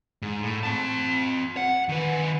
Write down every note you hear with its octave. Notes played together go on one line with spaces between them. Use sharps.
G#2
A2
C4 A5
F#5
D#3 B4